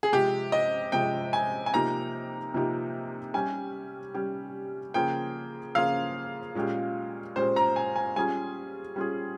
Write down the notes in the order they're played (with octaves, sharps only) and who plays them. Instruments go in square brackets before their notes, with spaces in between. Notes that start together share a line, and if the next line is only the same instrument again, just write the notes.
[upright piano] G#4
[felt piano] C3 F3 G#3 [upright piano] G4
[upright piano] D#5
[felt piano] C3 F3 G#3 [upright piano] G5
[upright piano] G#5
G#5
[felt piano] C3 F3 A#3 D#4 G4 [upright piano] A#5
[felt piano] C3 F3 A#3 D#4 G4
[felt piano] G3 C#4 G4 [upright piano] G#5
[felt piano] G3 C#4 G4
[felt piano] C#3 F3 A#3 F4 G#4 [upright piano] G5
[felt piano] C#3 F3 A#3 F4 G#4 [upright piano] F5
[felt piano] A#2 G#3 C#4 G4
[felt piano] A#2 G#3 C#4 G4 [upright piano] C5
[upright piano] A#5
G#5
G#5
[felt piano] G3 C#4 F4 G#4 [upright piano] G#5
[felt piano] G3 C#4 F4 G#4